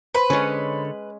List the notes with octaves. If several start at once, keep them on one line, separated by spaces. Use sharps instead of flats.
B4 C5 B5 C6
D3 G#3 C#4 A4 C#5